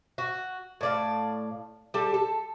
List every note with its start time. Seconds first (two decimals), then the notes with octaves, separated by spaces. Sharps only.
0.18 F#4
0.81 A2 D5 F5
1.94 G3 G4 A4
2.14 A4